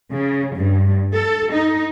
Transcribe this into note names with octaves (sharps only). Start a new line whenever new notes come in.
C#3
G2
A4
D#4